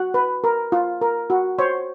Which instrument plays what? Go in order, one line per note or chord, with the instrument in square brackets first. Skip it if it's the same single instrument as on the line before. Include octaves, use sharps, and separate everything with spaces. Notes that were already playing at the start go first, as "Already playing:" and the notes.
Already playing: [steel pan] F#4 F#5
B4
A#4
F4
A#4
F#4
C5 C#5